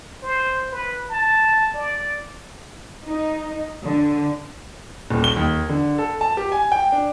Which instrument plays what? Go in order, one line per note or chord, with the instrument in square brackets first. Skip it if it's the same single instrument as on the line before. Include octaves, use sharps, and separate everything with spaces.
[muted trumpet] C5
B4
A5
D5
[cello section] D#4
D3
[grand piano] D#1
G7
D#2
D3
A4
A5
G4
G#5
G5
D4